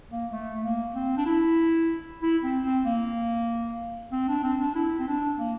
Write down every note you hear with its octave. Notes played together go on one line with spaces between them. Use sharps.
A#3
A3
A#3
C4
D4
E4
E4
C4
C4
A#3
C4
D4
C4
D4
E4
C4
D4
A#3